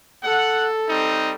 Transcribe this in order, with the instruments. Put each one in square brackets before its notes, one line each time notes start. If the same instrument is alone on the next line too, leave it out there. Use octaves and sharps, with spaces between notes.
[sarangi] A4 [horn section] F#5
[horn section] G3 C4 D#4